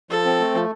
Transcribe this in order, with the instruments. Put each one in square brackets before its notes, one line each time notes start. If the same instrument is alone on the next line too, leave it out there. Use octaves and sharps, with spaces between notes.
[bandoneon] F3 [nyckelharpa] A4
[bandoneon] C4
A3
F3